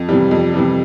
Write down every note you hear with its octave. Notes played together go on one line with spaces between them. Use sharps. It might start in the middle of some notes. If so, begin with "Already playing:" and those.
Already playing: F2
C3 E3 G3
F2
C3 E3 G3